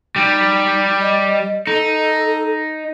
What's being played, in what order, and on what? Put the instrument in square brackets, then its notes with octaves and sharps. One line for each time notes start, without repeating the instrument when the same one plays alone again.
[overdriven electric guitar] G3 [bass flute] D#4
[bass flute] D#5
[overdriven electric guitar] D#4 [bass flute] A4